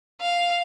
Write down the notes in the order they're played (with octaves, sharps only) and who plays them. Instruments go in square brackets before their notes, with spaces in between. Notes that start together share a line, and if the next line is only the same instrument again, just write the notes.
[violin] F5